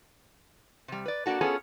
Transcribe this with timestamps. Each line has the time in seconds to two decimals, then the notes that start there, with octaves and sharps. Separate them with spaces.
0.88 C3 G3
1.06 B4 D5
1.26 A#3 D4 F#4 A4
1.41 B3 C#4 F4 G#4 A4